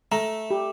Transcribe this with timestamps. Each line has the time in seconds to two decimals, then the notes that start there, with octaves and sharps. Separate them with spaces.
0.12 A3 A#5
0.51 G4